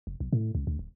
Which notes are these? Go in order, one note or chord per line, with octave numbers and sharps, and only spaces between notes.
F1
B1
A2
C#2
D2
D1